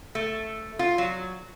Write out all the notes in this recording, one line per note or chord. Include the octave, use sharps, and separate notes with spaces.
A3
F4
F#3